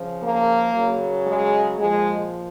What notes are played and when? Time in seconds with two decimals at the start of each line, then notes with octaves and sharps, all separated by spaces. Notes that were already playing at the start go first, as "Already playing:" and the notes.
Already playing: C#3 F3
0.22 A#3
0.74 C#3 F#3
1.26 G#3
1.78 A#2 F3 G#3